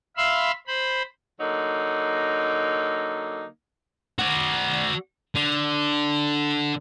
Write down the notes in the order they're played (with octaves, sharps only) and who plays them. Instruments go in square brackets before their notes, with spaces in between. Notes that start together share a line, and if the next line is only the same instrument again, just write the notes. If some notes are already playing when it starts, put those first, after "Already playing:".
[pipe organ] E5 F5 B5 C6 E6
C5 B5
[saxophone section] D3 F#3 A#3 D#4
[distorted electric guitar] F#4 D5
D3